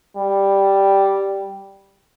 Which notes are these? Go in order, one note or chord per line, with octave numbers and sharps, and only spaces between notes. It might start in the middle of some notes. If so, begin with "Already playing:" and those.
G3